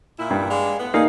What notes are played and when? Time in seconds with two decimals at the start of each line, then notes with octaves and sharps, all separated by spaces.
0.19 A#2 E4
0.30 G2
0.50 G#3 D4 F5
0.79 A2 B3
0.94 A#3 D#4 G#4 F5